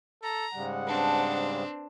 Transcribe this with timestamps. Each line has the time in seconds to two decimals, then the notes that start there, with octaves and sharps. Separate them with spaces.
0.23 A4 A#5
0.54 G#2 C#3 G3 F#5
0.87 C4 D4 B4 A5